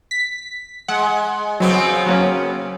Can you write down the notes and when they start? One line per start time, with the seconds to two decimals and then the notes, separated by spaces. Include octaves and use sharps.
0.11 B6
0.88 G#3 F#5
1.60 C#3 F#3 B3 C4
2.06 F#3 A#3 C#4